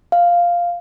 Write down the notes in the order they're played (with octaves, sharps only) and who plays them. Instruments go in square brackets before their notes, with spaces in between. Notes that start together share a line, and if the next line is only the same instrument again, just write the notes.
[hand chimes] F5